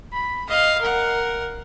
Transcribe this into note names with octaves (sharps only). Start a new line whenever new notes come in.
B5
D#5 F5
A#4 F#5